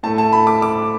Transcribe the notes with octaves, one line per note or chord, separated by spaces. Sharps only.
A2 A3 A5
A5
B5
D6
D6